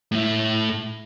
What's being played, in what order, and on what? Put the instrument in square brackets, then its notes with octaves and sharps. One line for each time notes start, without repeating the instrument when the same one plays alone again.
[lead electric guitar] A2 E4